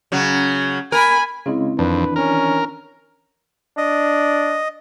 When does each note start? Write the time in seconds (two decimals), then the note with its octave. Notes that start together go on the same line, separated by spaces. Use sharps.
0.12 C#3 F#3
0.92 A#4 G#5 B5
1.46 C#3 G#3 C4 E4
1.79 F2 D#3 E3 D4 B4
2.16 C#4 A#4
3.78 D4 D#5